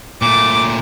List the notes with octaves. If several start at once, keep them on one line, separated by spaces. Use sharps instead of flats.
A#2 A3 D6